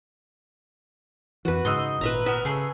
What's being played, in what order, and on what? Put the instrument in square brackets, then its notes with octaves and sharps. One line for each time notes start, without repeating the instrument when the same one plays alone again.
[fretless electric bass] F2 E3 [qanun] F#4 B4
[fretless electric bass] G#2 C#3 [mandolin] D#4 D#5 E6 [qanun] C6
[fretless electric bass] G#1 A#2 [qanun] B4 E5 A#5
[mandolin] B3 A#4 [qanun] E5
[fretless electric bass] C#3 [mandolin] A3 G#4